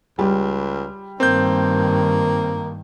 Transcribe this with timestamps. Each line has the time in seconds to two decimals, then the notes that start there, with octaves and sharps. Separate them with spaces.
0.19 C#2 G3
1.20 G2 D#3 A#3 C4 G6